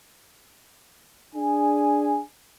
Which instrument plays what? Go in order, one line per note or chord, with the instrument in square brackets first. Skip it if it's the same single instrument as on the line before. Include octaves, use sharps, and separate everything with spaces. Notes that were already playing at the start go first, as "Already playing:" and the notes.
[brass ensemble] D4 G#4 G#5